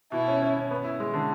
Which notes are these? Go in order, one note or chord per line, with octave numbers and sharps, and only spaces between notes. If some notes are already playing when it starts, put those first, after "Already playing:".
B2 E4
C#4
C#4
C#4
B3
E4
G#3
D3